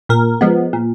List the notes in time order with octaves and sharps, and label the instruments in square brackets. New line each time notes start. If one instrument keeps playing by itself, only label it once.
[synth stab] A#2 A#4
F3 G#3 B3
A#2